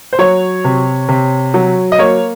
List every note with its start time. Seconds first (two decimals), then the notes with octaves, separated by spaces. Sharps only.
0.13 C5
0.19 F#3 C#5
0.64 C3
1.08 C3
1.54 F#3
1.92 D#5
1.98 A#3 C#5